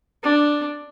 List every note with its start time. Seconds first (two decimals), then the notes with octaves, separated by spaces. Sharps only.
0.23 D4